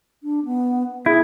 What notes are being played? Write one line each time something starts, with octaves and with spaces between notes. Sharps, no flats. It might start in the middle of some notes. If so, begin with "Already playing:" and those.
D4
B3
E4 G#4